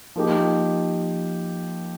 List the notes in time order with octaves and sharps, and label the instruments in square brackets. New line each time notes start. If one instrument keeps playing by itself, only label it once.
[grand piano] F3 A#3 D#4 G4